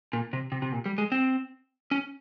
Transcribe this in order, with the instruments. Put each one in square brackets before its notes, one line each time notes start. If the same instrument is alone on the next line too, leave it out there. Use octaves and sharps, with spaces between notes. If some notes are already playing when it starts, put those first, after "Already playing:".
[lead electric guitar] A#2
C3
C3
C3
A#2
G3
G#3
C4
C#4